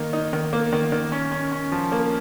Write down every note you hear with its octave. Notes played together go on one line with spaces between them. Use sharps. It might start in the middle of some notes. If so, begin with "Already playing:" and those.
Already playing: D#3 A#3 D#4
D#4
D#3
A#3
D#3
D#3
C#4
C#4
C#4
F3
A#3